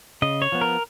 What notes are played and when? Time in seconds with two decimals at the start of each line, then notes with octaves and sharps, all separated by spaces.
0.22 C#3 D#5
0.42 C#5
0.52 F3 B3
0.61 A#4